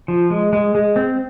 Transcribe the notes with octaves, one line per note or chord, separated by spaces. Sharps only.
F3
G#3
G#3
G#3
C4